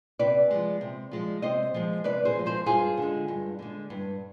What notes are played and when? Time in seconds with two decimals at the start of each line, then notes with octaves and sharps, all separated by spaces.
0.19 C3 B4 D5
0.51 F3 G#3
0.81 C3
1.11 F3 G#3
1.42 C3 C5 D#5
1.74 F3 G#3
2.04 C3 B4 D5
2.25 G#4 C5
2.36 F3 G#3
2.46 G#4 C5
2.66 G2 F4 G#4
2.97 D3 G#3
3.28 G2
3.59 D3 G#3
3.90 G2